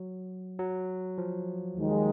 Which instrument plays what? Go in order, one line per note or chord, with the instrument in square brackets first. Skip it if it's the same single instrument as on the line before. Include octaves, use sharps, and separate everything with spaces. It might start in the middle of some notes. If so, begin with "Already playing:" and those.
Already playing: [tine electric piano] F#3
F#3
F3
[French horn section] D#2 D#3 G#3 D#4